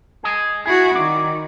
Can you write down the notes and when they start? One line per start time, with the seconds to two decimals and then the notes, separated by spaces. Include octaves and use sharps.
0.24 G#4 D#5
0.66 E4 F#4 G#4
0.95 D#3 D5